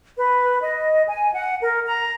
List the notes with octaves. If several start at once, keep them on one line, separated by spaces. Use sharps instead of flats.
B4
D#5
G#5
F#5
A#4
A#5